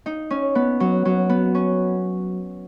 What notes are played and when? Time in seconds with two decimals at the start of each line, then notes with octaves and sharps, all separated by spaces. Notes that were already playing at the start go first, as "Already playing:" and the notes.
0.06 D#4
0.30 C#4
0.55 B3
0.80 F#3
1.05 F#3
1.29 B3
1.55 C#4